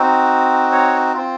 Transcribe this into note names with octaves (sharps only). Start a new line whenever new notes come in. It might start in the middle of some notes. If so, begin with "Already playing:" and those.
Already playing: C4 D#4 F#4
C#5
C4 F4